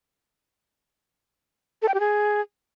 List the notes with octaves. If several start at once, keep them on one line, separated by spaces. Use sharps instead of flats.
A4
G5
G4
G#4